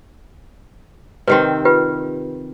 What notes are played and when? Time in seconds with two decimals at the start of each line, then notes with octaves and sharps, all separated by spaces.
1.28 C3 D#3 C4 G4 B4
1.65 F4 G4 B4